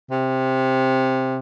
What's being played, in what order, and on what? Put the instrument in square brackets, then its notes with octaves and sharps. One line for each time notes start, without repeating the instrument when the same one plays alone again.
[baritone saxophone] C3